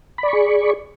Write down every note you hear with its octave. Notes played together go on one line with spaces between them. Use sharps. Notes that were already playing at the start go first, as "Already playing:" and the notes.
G#4 D5 B5 C#6